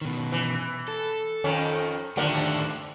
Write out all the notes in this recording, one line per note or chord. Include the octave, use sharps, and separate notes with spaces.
B2 D#3
E3
A4
F2 D#3 C#4
D3 D#3 F3 A3 A#3 G4